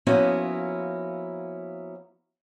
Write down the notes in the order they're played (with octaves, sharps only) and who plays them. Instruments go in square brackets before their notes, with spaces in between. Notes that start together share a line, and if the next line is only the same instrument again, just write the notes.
[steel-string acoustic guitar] F3 A#3 B3 C#4 E4 F#4